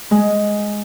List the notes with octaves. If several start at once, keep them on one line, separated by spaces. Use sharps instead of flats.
G#3